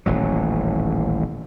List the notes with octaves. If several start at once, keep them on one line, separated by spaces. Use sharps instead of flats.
D#1 A1 F#3